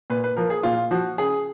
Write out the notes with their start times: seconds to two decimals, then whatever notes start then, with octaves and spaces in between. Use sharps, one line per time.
0.10 A#2 B4
0.24 B4
0.37 F3 A#4
0.50 G#4
0.63 A#2 F4
0.91 F3 F#4
1.18 C#3 G#4